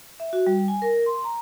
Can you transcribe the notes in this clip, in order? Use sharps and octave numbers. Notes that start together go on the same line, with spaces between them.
E5
F#4
G3
G#5
A#4
C6
A#5